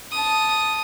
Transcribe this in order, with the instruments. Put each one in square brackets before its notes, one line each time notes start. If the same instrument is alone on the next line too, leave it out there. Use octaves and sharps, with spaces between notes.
[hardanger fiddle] A5 D#6